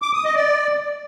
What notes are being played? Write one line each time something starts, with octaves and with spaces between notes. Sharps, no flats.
D6
D#6
D#5
D5